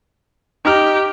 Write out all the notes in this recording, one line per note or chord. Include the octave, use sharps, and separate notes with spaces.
D#4 G4 A#5 F6